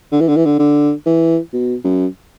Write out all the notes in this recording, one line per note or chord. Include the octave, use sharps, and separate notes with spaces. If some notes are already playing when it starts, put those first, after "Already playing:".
D3
E3
D3
E3
D3
D3
E3
B2
F#2